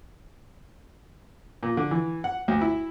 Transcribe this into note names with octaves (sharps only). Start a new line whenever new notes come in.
A#2
D3
E3
F#5
D2
E4